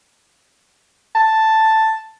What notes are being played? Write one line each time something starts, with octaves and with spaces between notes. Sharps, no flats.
A5